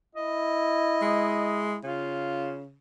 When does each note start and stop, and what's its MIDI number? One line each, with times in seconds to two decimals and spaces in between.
0.15 1.87 64
0.15 1.62 75
1.02 1.77 56
1.84 2.77 49
1.84 2.59 65